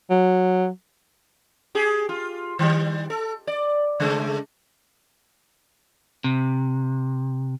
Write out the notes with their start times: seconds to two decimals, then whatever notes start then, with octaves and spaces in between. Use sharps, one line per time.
0.10 F#3
1.75 G4 G#4
2.09 F4
2.59 D#3 G3
3.10 A4
3.47 D5
4.00 C#3 G#3 A3
6.24 C3